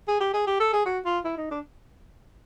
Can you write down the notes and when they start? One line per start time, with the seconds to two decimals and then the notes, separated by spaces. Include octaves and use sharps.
0.08 G#4
0.20 G4
0.34 G#4
0.47 G4
0.60 A4
0.73 G#4
0.86 F#4
1.05 F4
1.24 E4
1.37 D#4
1.51 D4